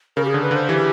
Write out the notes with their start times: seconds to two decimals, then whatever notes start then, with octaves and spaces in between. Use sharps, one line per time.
0.16 C#3 A#4
0.25 G4
0.29 D3 G#4
0.42 B4
0.51 D3 C5
0.69 E3 G4